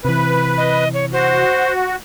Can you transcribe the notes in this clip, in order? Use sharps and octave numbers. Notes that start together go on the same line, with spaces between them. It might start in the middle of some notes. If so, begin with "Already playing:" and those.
C3 E3 B4
D#5
C#5
F#4 C5